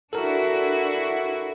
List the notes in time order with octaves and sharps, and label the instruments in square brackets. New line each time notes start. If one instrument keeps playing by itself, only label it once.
[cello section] D4 E4 F#4 [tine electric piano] A4 A#4